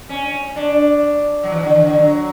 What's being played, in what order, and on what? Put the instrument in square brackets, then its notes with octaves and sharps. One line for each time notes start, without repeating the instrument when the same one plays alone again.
[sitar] C#4
D4
F#3
E3
D3
E3
D3
F#3